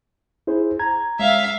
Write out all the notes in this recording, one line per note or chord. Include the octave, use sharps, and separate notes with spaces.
E4 G#4 C5
A#5 G#6
G#3 E5 F5